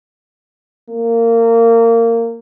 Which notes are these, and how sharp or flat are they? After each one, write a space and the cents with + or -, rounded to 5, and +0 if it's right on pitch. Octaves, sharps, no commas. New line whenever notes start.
A#3 -20